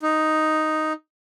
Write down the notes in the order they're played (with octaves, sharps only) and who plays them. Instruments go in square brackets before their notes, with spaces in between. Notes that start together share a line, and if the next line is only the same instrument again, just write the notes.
[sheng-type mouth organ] D#4